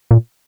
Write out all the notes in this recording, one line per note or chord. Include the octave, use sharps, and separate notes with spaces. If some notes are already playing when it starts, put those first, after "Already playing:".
A#2